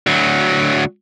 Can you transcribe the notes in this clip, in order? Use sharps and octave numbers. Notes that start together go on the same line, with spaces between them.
D2 F#3